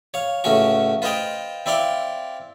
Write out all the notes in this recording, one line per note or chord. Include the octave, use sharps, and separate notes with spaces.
C#5 F5
C#2 A2 A3 C#4 F#4 C#6
F4 B4 C5 D#5 F5 G5
C4 E4 D5 F5 C6